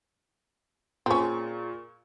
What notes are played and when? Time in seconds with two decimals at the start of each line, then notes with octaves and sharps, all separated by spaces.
1.06 A#2 C4 C#4 F4 G#4 A#5 C#6